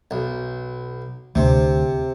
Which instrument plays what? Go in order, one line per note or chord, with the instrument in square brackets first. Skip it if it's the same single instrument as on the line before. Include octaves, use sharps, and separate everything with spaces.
[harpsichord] B1
[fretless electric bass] D2 [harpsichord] C3